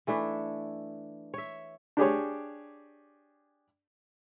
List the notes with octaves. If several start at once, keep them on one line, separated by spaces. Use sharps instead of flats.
E3 A3 D4 E4
C#5 E5
D4 G4 G#4 C#5